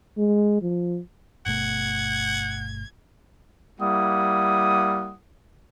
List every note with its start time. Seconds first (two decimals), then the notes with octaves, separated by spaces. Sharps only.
0.18 G#3
0.62 F3
1.46 G1 B2 A3 F#5 G#6
3.80 G3 A#3 E4 F#5 D#6